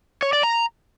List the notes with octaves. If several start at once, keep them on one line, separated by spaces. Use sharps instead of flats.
C#5
D5
A#5